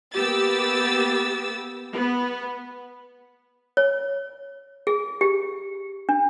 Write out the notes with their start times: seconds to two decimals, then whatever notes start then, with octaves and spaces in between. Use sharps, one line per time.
0.14 A#3 B3 G4 E6 A6
1.93 B3
3.77 C#5
4.87 G#4
5.21 G4
6.09 D4